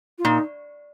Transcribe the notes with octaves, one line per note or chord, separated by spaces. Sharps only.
F4
A#2 D#4